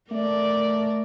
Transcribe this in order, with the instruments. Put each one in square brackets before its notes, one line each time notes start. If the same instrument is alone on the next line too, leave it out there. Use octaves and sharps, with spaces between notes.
[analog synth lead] A3 [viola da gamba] A#4 D5